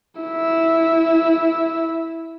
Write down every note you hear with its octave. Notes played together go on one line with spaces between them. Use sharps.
E4 E5